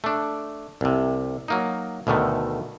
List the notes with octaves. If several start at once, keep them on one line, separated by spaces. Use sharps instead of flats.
A3 D4
C2 C3
F#3 A#3 D#4
D2 B2 D3 D#3 A3